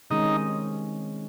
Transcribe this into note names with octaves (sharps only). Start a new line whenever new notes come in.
C3 D#3 G#3 C#4 D#4